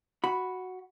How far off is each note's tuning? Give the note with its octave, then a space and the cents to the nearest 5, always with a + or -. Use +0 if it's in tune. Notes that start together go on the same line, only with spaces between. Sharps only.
F#4 +0 B5 +0